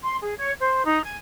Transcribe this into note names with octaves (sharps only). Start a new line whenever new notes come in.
C6
G#4
C#5
C5
D#4
G#5